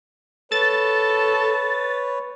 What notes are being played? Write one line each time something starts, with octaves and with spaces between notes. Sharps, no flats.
A4 B4 C#5 A6